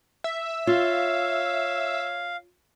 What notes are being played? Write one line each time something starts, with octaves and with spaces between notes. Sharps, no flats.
E5
F4 C#5 F5